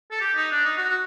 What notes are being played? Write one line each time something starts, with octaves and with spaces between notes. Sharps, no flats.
A4
G4
D#4
D4
D#4
F#4
F#4